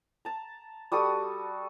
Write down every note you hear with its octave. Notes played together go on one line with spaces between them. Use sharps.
A5 A#5
G3 F#4 A4 D#6